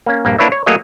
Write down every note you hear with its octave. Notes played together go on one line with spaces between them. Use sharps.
A#3 C#4
A#1 G2 A#3
A#3 D4 E4 B4 C#5 E5
C#5
F#3 A3 A#3 G#4 C#5 D#5